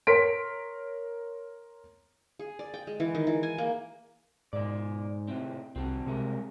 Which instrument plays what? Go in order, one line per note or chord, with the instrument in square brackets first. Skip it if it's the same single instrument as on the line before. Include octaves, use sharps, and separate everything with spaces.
[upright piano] A#4 C#5 C6 B6 D7
[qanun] G#4
D5
G5
G#3
E3
D#3
E3
G#5
A#3
[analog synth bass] G#2 [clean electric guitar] B2 D5
[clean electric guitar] A2 C3 C4
[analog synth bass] C2 [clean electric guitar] C4 F#4
[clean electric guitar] C2 G#3 A#4 [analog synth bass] C3